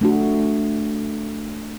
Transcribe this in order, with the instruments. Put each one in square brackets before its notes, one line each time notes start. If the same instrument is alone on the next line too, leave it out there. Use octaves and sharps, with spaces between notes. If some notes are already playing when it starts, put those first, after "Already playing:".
[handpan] A3 D4 F#4